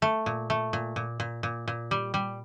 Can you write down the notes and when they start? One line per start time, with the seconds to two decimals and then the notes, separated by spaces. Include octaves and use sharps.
0.02 A3
0.26 A#2
0.50 A3
0.73 A#2
0.96 A#2
1.20 A#2
1.43 A#2
1.68 A#2
1.91 G3
2.14 G3